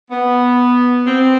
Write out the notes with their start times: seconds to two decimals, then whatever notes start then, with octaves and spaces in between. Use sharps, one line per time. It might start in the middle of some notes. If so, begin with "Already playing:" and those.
0.11 B3
1.07 C4